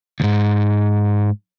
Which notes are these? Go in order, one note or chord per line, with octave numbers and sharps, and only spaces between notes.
D2 G#2